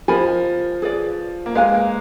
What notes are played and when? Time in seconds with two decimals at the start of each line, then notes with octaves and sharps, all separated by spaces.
0.08 F3 A#4 D#5 G#5 B5
0.82 G#4 B4 D5
1.46 A#3
1.55 G#3 B4 F5 G#5
1.73 A#3